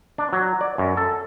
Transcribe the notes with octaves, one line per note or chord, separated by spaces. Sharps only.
D4
F#3
D5
F#2
A4